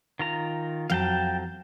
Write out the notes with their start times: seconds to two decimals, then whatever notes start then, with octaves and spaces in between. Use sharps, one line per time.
0.19 D#3 F4 A#5
0.90 F2 F#3 F5 G5 A5